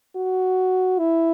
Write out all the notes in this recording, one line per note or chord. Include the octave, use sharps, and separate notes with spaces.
F#4
E4